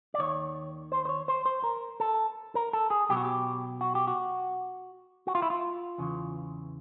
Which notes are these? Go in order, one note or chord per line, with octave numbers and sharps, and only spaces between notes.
D5
D#2 D#3 C#5
C5
C5
C#5
C5
C5
A#4
A4
A#4
A4
G#4
B1 B2 F#3 G4
F#4
G4
F#4
G4
F#4
F#4
F4
E4
F4
E2 C#3 E3